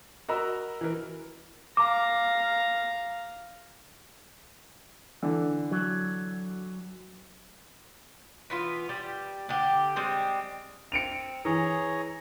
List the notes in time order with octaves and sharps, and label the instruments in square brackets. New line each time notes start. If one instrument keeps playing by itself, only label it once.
[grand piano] F#4 A#4 D#5 A#5 B5 E6
E3 A#4
[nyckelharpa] F5 A#5 [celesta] D6
[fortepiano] D3 E3
[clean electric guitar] F#3
[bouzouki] E3 B3 F4
G3 G4
D3 G4
G3 G#3 C4
[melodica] C4 [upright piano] C#7 D7 F7
[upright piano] E3 [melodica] G#4 C#5 A#5